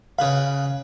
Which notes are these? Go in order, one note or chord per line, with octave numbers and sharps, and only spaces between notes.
C#3 B4 F5 B5